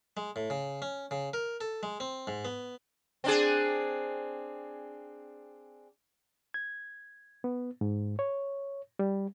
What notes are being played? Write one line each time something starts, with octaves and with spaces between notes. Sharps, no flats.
G#3
A2
C#3
C#4
C#3
A#4
A4
G#3
C4
G#2
B3
C4 D4 G#4
G#6
B3
G#2
C#5
G3